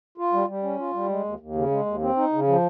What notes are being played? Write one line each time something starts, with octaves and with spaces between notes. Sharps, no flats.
F4
G3
G3
C#4
F4
G3
G#3
D#2
D#2
C#3
G#3
D#2
C4
D#4
C#3
F3